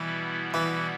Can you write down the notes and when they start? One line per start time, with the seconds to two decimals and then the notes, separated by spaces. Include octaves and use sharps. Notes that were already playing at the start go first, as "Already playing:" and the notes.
Already playing: B2 E3 G3 B3 E4
0.54 E3